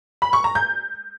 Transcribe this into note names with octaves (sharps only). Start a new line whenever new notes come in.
B5
C#6
A#5
G6